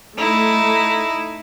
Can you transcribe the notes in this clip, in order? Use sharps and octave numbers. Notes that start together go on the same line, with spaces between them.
A3 D#4 E4